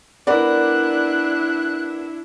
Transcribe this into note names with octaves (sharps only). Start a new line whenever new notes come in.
B3 D4 E4 A#4 D5 F#6